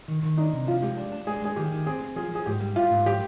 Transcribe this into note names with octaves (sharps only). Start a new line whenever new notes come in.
D#3
D#3
D4 D#4
C3
F3 F4
G#3 G4
D4
D4
G#3 G#4
G#3 G#4
D#3 G4
D#3
C4 G#4
C4
F3 G#4
F3 G#4
G#2 G4
G3
F4 G4
G#2
F3 G4